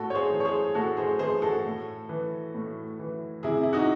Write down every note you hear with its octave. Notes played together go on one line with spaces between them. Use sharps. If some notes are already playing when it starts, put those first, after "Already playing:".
Already playing: A2 F#4 A4
C#5
G#4 C5
E3
C#5
G#4 C5
A2 F#4 A4
G#4 C5
E3 G#4 C5
F#4 A4
A2
E3
A2
E3
C3 E4 G#4
E4
D#4 F#4